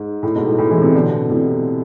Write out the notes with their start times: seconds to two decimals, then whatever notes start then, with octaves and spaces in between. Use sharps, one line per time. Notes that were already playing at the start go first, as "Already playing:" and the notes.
Already playing: G#2
0.23 A2
0.35 G#2 B2
0.46 A2
0.58 A2
0.71 E3 G#3
0.82 C3 E3
0.94 B2 D3
1.30 A2 C3